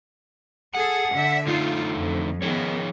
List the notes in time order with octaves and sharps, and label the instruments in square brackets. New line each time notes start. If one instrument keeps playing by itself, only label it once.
[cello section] G#4 A4 [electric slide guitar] F#5
[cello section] D3 E5
[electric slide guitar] D3 A3 D#4 [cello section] F4
[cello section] F2
[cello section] D#3 B3 [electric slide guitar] F3 G#4 C#5